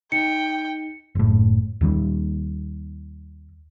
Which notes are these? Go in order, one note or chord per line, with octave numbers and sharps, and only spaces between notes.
D#4 G5 C#7
F#1 A2
D#2 D#3 G3